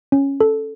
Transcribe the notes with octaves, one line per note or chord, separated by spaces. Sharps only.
C#4
A4